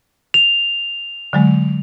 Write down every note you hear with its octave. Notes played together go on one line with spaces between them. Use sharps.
F7
D3 F#3 G#3